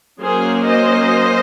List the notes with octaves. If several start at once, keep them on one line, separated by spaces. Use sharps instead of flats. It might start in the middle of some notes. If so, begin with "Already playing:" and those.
F#3 A#3 C#4 G#4 C5
C5 D#5